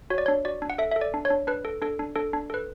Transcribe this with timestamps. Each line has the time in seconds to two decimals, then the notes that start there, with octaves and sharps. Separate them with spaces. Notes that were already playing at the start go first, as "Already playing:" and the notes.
0.10 F#4 C#5
0.18 D5
0.26 D4 C#5
0.45 F#4 D5
0.62 D4
0.70 F#5
0.78 A4 E5
0.91 A4 E5
1.01 D5
1.14 D4
1.25 C#5
1.30 D4
1.47 D4 B4
1.65 A4
1.82 D4 A4
1.99 D4
2.15 D4 A4
2.33 D4
2.50 A4 B4